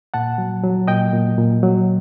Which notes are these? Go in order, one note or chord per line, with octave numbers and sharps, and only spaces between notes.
A#2 F#5 A5
F#3
F#3
A#2 D#5 G5
A#2
A#2
F#3